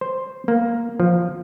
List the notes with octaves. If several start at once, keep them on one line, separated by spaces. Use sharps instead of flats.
C5
A#3
F3